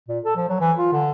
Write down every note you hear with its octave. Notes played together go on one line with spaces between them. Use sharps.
A#2
A4
F3
F#3
E3
F4
D3